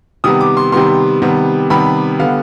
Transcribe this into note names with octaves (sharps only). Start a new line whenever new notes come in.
C3 D#3 G3 B3 D#6
D6
C6
C3 D#3 G3 B3 C6
C3 D#3 G3 B3
C3 D#3 G3 B3 B5
D3 G3 B3 F5